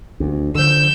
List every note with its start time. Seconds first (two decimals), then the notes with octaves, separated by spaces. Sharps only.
0.20 D2
0.55 D3 F3 E6 G6